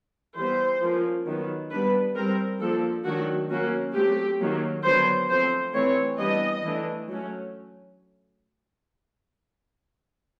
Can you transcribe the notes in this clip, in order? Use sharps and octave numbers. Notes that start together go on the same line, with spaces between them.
E3 G3 B3 C5
F3 A#3 C#4
D#3 F#3 B3
G3 B3 D4 B4
G3 C4 A#4
F3 A#3 D4 A4
D#3 F#3 A3 D4 F#4
F#3 A#3 C#4 F#4
F#3 A3 C4 G4
D#3 F#3 A#3 C#4
D3 F#3 B3 D4 C5
F3 A3 C4 C5
E3 A3 C4 C#5
E3 G3 B3 D4 D#5
E3 A3 D4
F#3 A3 C#4